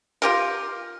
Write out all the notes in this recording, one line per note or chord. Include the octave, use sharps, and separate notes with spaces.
F4 G4 A#4